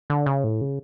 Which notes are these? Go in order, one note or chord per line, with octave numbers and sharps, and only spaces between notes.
D3
C#3
A2
C#3